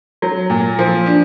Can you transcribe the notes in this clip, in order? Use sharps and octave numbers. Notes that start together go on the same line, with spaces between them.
F#3
A#2
F3
D4